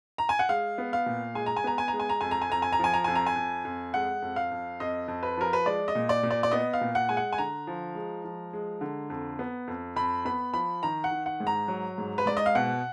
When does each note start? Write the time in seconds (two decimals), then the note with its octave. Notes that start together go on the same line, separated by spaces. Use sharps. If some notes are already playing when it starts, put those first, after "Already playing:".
0.18 A#5
0.29 G#5
0.39 F#5
0.49 G#3 F5
0.78 B3
0.93 F5
1.06 A#2
1.35 G#3 G#5
1.46 A#5
1.57 G#5
1.64 B3 A#5
1.78 G#5
1.88 G#3 A#5
2.00 G#5
2.09 A#5
2.21 F2 G#5
2.31 A#5
2.42 G#5
2.50 F2 A#5
2.62 G#5
2.73 A#5
2.79 F3 G#5
2.94 A#5
3.04 F2 G#5
3.15 A#5
3.26 G#5
3.36 F2
3.65 F2
3.94 G#3 F#5
4.22 F2
4.36 F5
4.51 F2
4.80 F2 D#5
5.08 F2
5.23 B4
5.37 F3 A#4
5.53 B4
5.66 G#3 D5
5.88 D#5
5.95 A#2
6.09 D5
6.23 A#2
6.31 D5
6.43 D5
6.51 B3 D#5
6.74 F5
6.81 A#2
6.95 F#5
7.09 G#3 G#5
7.17 F#5
7.33 G#5
7.38 D3 A#5
7.67 F3
7.95 G#3
8.25 F3
8.53 G#3
8.81 D3
9.10 F2
9.39 B3
9.68 F2
9.96 F2 B5
10.25 B3 B5
10.54 F3 B5
10.83 D#3 A#5
11.04 F#5
11.11 D#3
11.26 F#5
11.40 G#2
11.47 A#5
11.68 F#3
11.98 G#2
12.18 B4
12.25 G#2 D5
12.37 D#5
12.46 F5
12.55 B2 F#5